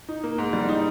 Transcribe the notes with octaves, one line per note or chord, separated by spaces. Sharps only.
D#4
A#3
G#2
G3
D#4